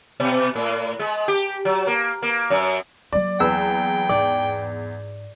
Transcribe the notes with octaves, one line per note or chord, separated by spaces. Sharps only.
B2
A2
G#3
G4
F#3
A#3
A#3
F#2
F#3 A#3 D5
E2 B4 G5 E6
G#2 D5